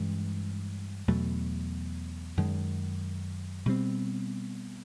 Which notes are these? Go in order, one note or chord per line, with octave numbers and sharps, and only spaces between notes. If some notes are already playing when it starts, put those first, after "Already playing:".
Already playing: G2 E3 G#3 C#4
E2 B2 F#3 A3
F#2 D#3 G#3
B2 G3 C4